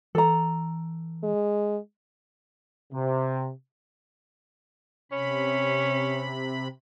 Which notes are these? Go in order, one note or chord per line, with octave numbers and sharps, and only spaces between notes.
E3 A4 A#5
G#3
C3
C3 C#4 B5